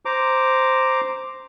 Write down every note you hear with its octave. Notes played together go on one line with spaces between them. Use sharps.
C5 A#5 D6